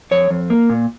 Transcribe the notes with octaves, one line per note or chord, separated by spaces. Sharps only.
F2 C#5
F2
A#3
A#2